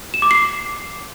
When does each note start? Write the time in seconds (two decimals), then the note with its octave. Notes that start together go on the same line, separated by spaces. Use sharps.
0.14 E7
0.22 D6
0.31 C7